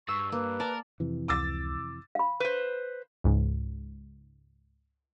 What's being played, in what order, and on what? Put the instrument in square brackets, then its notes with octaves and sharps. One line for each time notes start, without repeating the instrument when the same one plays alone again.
[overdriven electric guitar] G2 [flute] C#6 [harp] E6
[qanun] A#3 [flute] B4
[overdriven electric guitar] A#4 [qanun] D5 [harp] A5
[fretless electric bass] F2 C3 E3
[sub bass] C#2 [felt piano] D6 E6 A6
[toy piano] F5 B5
[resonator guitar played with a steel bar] B4 C5
[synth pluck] C#2 G#2